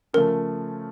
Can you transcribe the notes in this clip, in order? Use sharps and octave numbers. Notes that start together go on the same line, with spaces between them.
C#3 F3 A3 A#4